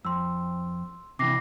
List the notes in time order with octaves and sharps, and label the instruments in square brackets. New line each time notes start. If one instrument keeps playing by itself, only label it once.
[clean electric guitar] F2 [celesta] C6 E6
[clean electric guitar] C3 E3 [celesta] D6 A#6 C7